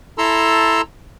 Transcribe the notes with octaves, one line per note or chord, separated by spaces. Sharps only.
E4 A4 A5 A#5 C6 E6